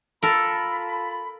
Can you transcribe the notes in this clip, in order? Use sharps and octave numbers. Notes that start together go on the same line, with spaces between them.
F4 A4 A#4 A5 B5